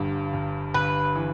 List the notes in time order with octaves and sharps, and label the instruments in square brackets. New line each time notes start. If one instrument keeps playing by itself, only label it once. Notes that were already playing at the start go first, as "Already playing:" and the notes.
Already playing: [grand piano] G1 G2
G1
[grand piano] G1 [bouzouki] B4
[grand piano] E3